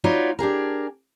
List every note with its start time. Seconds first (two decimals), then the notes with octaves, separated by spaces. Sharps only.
0.04 D#4 F4 F#4 B4 C#5 D5
0.39 D4 G4 G#4 A#4